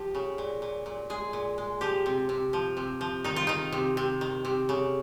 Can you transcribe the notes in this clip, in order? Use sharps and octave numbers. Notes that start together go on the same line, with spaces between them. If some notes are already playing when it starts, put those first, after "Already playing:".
Already playing: F3 G4
C#3
A#2
A#2
A#2
G#3 G#4
A#2
G#3
F3 G4
C3
C3
F3
C3
F3
D#3 D#4
F4
D#3 D#4
C3
C3
D#3
C3
C#3